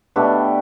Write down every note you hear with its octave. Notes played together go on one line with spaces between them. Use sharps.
B2 A3 D4 G4